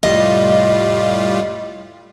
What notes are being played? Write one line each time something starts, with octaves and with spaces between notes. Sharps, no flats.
F1 A2 G3 F4 D#5